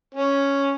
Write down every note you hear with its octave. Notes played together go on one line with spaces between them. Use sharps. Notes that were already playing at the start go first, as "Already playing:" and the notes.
C#4